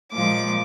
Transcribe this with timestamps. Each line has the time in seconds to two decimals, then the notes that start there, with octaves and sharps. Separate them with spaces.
0.13 A#2 F3 G#3 D6